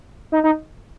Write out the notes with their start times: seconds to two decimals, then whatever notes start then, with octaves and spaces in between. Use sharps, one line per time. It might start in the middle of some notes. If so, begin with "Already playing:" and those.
0.32 D#4
0.44 D#4